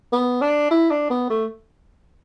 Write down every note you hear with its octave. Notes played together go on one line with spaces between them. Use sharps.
B3
D4
E4
D4
B3
A3